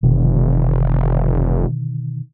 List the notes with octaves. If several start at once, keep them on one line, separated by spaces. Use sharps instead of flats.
F1 B2 D3 D#3